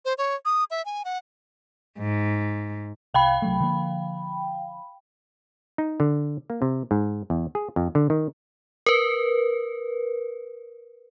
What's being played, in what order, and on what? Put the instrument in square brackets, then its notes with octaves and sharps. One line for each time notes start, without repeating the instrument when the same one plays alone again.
[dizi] C5
C#5
D#6
E5
G#5
F#5
[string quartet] G#2
[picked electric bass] C2 [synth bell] F5 G5 B5
[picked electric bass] C2 F#3 A3
D3 F3 A#3
[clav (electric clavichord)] D#4
D3
A#3
C3
G#2
E2
G#4
F2
D3
D#3
[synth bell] A#4 B4